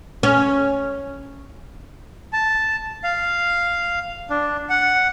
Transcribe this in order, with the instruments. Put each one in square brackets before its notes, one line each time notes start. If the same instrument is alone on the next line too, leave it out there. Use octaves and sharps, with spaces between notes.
[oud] C#4
[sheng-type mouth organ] A5
F5
D4
F#5